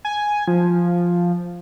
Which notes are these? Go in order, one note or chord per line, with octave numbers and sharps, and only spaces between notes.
G#5
F3